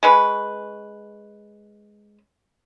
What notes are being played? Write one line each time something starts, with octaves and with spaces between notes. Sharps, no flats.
G#3 C#4 B4